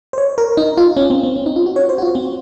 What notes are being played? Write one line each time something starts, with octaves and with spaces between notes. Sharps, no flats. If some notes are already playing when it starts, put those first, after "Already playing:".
C5
C#5
A#4
D#4
F4
C#4
C4
C4
C#4
D#4
F4
F#4
C#5
C5
F#4
F4
C4